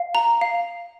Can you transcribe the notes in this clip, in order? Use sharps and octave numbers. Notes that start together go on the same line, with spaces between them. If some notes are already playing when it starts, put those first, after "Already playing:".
Already playing: F5
A#5
F5